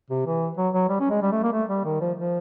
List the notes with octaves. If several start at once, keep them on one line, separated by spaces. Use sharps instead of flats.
C3
E3
F#3
F#3
G3
C#4
G#3
G3
A3
A#3
A3
G3
D#3
F3
F3